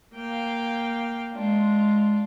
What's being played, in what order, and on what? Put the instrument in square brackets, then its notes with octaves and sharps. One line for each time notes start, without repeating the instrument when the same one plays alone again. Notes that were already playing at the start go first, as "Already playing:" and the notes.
[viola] A#3 [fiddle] F5 G5
[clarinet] G#3 [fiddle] D4 F4